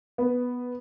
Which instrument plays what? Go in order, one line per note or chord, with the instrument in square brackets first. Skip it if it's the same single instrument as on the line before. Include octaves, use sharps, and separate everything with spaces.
[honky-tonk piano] B3